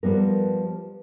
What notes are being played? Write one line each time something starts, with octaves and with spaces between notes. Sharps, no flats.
F3 G3 B3 A#4